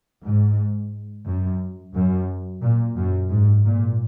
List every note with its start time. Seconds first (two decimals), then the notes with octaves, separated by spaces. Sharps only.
0.23 G#2
1.27 F#2
1.94 F#2
2.63 A#2
2.96 F#2
3.30 G#2
3.65 A#2